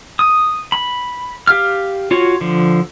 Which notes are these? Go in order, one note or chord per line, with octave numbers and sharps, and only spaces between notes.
D#6
B5
G4 F5 F6
F4 F#4 C#5
D3 F3